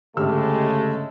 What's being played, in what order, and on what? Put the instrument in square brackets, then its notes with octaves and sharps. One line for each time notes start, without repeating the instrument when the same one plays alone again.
[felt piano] G1 E6 F6 [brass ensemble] C#3 G#3 [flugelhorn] A3 [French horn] G4